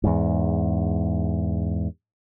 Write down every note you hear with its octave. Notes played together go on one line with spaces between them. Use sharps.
E2 G#2